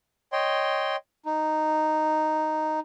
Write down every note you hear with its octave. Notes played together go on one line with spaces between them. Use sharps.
C#5 D#5 G5 C6
D#4